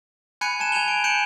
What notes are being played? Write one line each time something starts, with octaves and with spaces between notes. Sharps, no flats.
G#5 B5 F#6 G#6 C#7 D#7
A5 G#6 E7
G#5 G#6 D#7 F7 G7
D7
G6 C#7 D7 E7 F#7